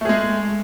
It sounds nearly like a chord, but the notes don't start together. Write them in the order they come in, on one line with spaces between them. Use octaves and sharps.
A3 G#4 G#3